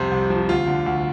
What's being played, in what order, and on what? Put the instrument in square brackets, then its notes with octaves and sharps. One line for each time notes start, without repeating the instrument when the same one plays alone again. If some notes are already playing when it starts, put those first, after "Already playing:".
Already playing: [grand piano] C2 F2 C3 C5
C2
F3
D2 F4
D3
D2